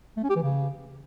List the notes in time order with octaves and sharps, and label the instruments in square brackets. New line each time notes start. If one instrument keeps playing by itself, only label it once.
[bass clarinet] A3
C#4
G4
E3
C#3